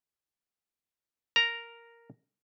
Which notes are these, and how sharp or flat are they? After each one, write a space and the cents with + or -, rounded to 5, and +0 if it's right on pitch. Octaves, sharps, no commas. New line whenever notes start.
A#4 +0 A#5 +0